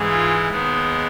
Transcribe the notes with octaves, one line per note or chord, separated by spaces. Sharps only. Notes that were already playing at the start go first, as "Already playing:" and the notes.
Already playing: G#2 E3 G#3
F4
D#2 D#3 G#3 B3